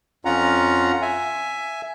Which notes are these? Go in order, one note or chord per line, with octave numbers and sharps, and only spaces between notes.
F2 C#4 F4 F#5 A#5
E5 G#5